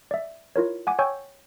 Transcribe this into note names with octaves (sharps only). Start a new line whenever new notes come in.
D5 E5
E4 F4 A#4 C#5
F#5 G#5 D6
C#5 G5 G#5 C#6 E6 G6